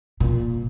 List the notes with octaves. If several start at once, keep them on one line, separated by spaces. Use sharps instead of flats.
A#2